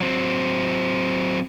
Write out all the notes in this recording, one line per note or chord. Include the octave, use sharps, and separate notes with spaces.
F#3 C4